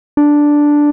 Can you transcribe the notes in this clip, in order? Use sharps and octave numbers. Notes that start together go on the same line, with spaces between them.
D4